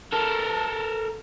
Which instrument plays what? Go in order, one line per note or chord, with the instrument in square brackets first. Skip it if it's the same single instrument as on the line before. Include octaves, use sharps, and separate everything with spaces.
[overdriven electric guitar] A4 A#4